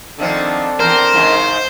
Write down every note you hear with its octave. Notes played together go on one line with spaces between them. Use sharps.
D3 D#3 F3 C4 D4 A4
E2 E3 A#4 C5
G#2 C#3 E3